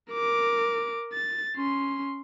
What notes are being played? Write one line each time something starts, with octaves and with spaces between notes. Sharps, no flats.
A#4 D6
A6
C#4 C6